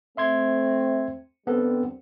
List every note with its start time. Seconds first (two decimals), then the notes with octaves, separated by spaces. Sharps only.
0.17 A3 C4 E5 C6 G#6
1.47 D3 G3 B3 C4 A4 A#4